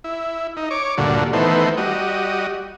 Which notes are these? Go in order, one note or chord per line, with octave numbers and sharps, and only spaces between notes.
E4
D#4
C#5 D6
D2 G2 A#2 D3 F#4
D#3 E3 A3 B3 C5
G3 F#4 D#5